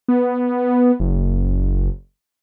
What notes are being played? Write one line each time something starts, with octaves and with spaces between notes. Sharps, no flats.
B3
F#1